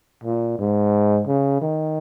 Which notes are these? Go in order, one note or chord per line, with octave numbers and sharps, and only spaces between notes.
A#2
G#2
C#3
D#3